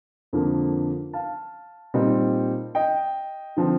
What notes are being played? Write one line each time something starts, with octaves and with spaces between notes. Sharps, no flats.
F2 D3 F3 A#3
F5 A5
A#2 G3 C4 D#4
D#5 G5
D3 F3 C4